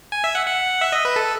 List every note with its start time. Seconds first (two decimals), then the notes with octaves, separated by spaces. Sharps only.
0.12 G#5
0.24 E5
0.35 F#5
0.47 F#5
0.81 E5
0.92 D#5
1.05 B4
1.16 A4